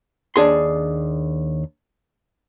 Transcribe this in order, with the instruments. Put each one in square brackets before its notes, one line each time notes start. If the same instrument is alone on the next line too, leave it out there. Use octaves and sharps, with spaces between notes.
[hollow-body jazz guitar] D#2 D4 G#4 C6